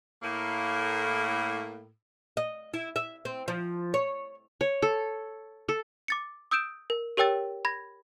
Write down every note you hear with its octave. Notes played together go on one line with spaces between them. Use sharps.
A2 A#3
D#5
E4
E5
C4
F3
C#5
C#5
A4
A4
D6 A6 C#7
D#6 E6 G6 D7 E7
A#4
G4 A#4 C#5 G5 E6 A6
B5 G#6 A#6